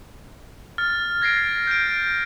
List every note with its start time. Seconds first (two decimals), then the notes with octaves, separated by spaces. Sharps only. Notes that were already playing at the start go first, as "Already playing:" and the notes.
0.78 F6 A6
1.22 G#6 A#6 C7 D7
1.67 G6 D7